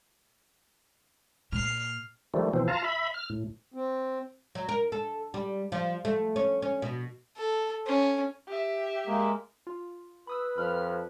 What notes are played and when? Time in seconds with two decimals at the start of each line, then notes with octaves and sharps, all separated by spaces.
1.52 A#2 F6 C7
2.34 D#3 F3 G3 A3
2.54 B2 E3 F3 C4
2.68 F4 F5 A5 A#5
2.84 E5 B5
3.14 F6
3.30 A2
3.74 C4
4.55 F#3
4.69 A#4
4.92 A4
5.34 G3
5.72 F3
6.05 A3
6.36 C#4
6.62 C#4
6.82 B2
7.37 A4
7.86 C#4
8.47 G4 E5
9.07 G#3 A#3
9.67 F4
10.27 B4 B5 D#6 E6
10.58 F2 B5 F6